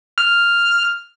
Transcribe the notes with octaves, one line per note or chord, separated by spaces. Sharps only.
F6